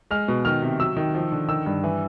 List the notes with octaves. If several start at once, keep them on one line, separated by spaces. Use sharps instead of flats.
G#3 F6
B2
D#3 F6
C3
F#3 E6
D#3
F3
D3
D#3 E6
G2
E3